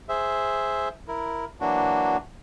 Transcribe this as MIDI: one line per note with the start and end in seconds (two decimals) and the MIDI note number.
0.09 0.88 68
0.09 0.88 72
0.09 0.88 76
1.08 1.45 64
1.08 1.45 70
1.60 2.17 52
1.60 2.17 54
1.60 2.17 58
1.60 2.17 62
1.60 2.17 66